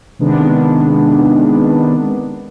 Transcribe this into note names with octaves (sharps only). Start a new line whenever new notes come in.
C3 D#3 G#3 B3 D4